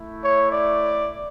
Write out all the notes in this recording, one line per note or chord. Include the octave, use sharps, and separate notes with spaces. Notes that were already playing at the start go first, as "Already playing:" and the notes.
Already playing: A3 E4
C#5
D5